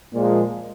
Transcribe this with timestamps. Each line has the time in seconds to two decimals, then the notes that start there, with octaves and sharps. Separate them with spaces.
0.13 A#2 F3 G#3